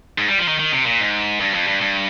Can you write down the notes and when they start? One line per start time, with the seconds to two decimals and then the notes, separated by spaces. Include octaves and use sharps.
0.18 G#2
0.28 G3
0.39 F3
0.48 D#3
0.59 D#3
0.73 C3
0.86 A#2
1.00 G#2
1.40 G2
1.54 F2
1.68 G2
1.81 G2